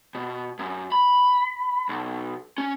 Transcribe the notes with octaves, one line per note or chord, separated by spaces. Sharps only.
B2
F#2
B5
B1
C#4